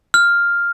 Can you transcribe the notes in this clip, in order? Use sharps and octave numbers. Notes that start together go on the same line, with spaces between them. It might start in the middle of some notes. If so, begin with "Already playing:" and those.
F6